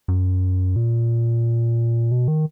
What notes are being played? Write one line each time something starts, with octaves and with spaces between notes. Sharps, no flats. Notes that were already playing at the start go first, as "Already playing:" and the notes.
F#2
A#2
B2
D#3